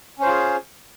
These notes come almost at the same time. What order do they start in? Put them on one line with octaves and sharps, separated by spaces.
C#4 C5 F4 G#4